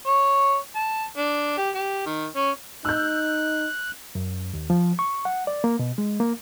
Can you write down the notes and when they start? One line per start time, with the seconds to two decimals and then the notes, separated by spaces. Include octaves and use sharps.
0.07 C#5
0.75 A5
1.18 D4
1.58 G4
1.75 G4
2.06 D#3
2.36 C#4
2.85 D#4 E6 F#6 G6
4.15 F#2
4.54 D#2
4.70 F3
4.99 C#6
5.25 F#5
5.47 D5
5.64 A#3
5.79 B2
5.98 G#3
6.20 A#3